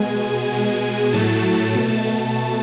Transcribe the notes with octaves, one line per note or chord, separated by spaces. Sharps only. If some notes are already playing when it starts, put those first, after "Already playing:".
Already playing: B2 G#3 G#5
G#5
B2 G#3
G#5
A2 F#3 A3 A5
B2 A3